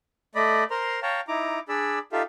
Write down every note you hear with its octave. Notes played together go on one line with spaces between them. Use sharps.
A3 D5 D#5 B5
A#4 C5 A#5 C6
C#5 F5 G5 A5 A#5
D#4 E4 A#5 D6
D4 G#4 D5 B5 E6
D#4 F4 G4 A4 E5 F5